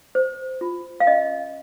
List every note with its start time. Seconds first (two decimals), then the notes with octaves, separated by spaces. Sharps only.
0.15 C5
0.61 F4
1.00 F5
1.07 C#4 D#5